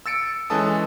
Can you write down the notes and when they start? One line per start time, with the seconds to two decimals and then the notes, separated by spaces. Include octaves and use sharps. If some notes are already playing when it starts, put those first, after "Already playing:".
0.06 E6 A6 C#7 D7
0.50 E3 G#3 C#4 A4 A5 D#6